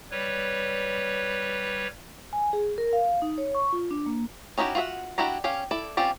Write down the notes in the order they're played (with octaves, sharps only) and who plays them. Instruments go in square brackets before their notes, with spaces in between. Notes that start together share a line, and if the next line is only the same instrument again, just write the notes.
[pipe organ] G3 B4 C#5
[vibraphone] G#5
G#4
A#4
F5
D#4
C#5
C#6
F4
D4
A#3
[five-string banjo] C#4 D#4 E4 F#4 G4
F4 F#4 C5 E5 F#5
D4 E4 F#4 G4 A#5
C#4 G4 C#5 F5
E4 A4 D5
C4 C#4 F4 G4 D5